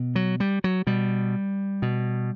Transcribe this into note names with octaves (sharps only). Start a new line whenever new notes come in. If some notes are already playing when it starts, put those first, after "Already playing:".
Already playing: B2
F#3
G3
F#3
B2 G3
B2